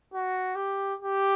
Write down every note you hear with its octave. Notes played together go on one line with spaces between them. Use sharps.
F#4
G4
G4